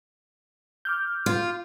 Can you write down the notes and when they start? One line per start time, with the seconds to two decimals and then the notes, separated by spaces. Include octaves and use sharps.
0.85 D6 F6 G6
1.26 F4